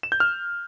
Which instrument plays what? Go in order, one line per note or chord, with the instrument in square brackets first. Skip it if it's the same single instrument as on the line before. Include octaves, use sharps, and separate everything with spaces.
[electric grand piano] E7
G6
F6